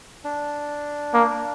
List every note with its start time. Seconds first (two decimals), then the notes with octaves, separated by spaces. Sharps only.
0.24 D4
1.14 A#3